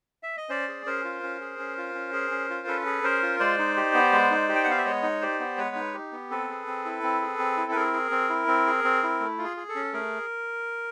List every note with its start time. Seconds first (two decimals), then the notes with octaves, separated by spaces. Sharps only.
0.23 E5
0.37 D#5
0.49 C#4 C5 D5
0.68 G#4
0.86 C#4 A#4 C5
1.04 F4
1.23 C#4
1.41 G#4
1.59 C#4
1.78 F4
1.95 C#4
2.13 G#4
2.31 C#4
2.50 F4
2.67 C#4 A4 B4
2.86 G#4
3.04 C#4 A#4 C5
3.23 F4
3.40 G#3 C5 D5
3.59 D#4
3.77 G4
3.94 B3
4.12 G#3
4.31 D#4
4.49 G4
4.55 G5
4.64 F#5
4.67 B3 F5
4.77 E5
4.85 G#3 C#5 D#5
5.03 D#4
5.21 G4 C5 D5
5.40 B3
5.57 G#3 B4 C#5
5.75 D#4
5.94 G4
6.12 B3
6.30 C4 A4 B4
6.49 G#4
6.67 C4
6.85 E4
7.03 C4
7.21 G#4
7.39 C4
7.57 E4
7.72 B4
7.75 C4 G#4 A#4
7.93 G#4
8.11 C4
8.29 E4
8.47 C4
8.67 G#4
8.84 C4
9.03 E4
9.20 A3
9.38 F4
9.44 G#4
9.57 G#4
9.69 A4
9.75 C#4
9.93 A3 G#4 A#4